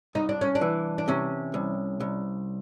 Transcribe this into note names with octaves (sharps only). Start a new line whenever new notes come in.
C2 D#4
D4
C#4
D4
E3
D4
C3 C#4
C2
C2